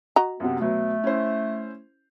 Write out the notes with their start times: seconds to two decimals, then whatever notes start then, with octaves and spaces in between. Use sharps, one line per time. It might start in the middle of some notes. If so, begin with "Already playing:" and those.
0.16 F#4 D#5 A#5
0.40 F#2 C3 B3
0.60 B2 F#3 A3 B3
1.04 C#4 E4 C5